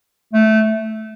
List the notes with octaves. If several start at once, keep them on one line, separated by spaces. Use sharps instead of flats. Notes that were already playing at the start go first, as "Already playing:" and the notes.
A3